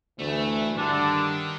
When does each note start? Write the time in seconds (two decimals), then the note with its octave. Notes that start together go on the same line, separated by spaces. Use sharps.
0.19 D2 E3 A3
0.78 G2 D3 D#3 D4